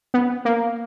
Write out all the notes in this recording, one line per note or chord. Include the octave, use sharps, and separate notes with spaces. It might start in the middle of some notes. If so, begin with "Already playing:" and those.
B3
A#3